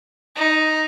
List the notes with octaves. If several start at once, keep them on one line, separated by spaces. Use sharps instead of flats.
D#4